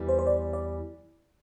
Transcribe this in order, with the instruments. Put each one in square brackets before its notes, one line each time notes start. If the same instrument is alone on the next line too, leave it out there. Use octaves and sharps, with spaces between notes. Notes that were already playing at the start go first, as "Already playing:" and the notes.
Already playing: [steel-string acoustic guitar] E2 E3 G3
[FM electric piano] C5
C5
D5
D5